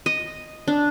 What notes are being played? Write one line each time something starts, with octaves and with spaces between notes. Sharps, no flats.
D#5
D4